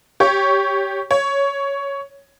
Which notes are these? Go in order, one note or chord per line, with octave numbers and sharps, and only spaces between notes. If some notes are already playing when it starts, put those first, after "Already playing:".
G4 C#5 C#6
C#5